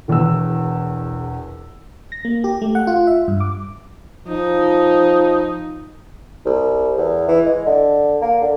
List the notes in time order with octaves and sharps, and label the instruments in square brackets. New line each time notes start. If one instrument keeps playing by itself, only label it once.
[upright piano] E1 E2 B4 E6
[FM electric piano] A#6
A#3
G4
A3
F#5
F4
E5
G2
D6
[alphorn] F3 [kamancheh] D#4
[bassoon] C2
E2
E3
G#3
D3
A#3
D3